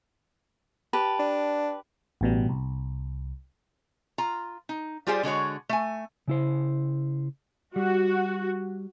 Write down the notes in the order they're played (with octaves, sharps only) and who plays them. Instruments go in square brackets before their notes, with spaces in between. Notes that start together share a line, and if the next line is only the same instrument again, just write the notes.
[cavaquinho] G4 B4 A5
[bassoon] D4
[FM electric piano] A1 B2 G3
C2
[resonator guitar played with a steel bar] F4 A#5
D#4
G3 F4 G4 G#4 C5 D5
D3 G#3 F#4 C#5
A3 G#5
[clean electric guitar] C#3 E4 C5
[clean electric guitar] G3 [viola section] F#4